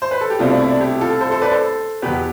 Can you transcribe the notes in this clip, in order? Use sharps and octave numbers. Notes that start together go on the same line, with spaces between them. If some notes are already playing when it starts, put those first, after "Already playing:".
C5
B4
A4
G4
C2 B2 A3 C4 D4 F4
D4 F4
E4
D4
E4 G4
F4 A4
A4 C5
A4 C5
B4 D5
A4 C5
E2 B2 B3 G4 B4